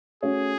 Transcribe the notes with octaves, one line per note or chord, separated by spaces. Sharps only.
A3 C#4 F#4 G#4 C#5